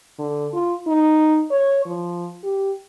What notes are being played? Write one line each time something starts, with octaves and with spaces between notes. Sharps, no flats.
D3
F4
D#4
C#5
F3
G4